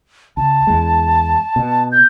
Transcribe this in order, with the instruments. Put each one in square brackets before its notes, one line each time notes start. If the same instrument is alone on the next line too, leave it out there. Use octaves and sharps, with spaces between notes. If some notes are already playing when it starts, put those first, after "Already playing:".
[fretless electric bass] C#2 [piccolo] A5
[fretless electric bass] E2 G#3
B2
[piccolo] G6